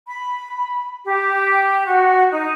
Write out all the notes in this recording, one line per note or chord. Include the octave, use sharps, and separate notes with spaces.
B5
G4
F#4
D#4